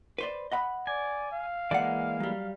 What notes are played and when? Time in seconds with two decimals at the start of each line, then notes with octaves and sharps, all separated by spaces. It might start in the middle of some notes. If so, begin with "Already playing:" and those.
0.18 B4 C5 D5
0.52 D#5 F#5 B5
0.87 D5 G#5
1.31 F5
1.71 E3 G#3 A#3 D5 F#5
2.20 F#3 G3